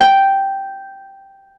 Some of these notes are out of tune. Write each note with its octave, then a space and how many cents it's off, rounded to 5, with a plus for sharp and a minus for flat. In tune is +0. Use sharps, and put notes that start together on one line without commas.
G5 -5